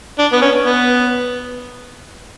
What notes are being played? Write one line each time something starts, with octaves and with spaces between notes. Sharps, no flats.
D4
B3
C#4
B3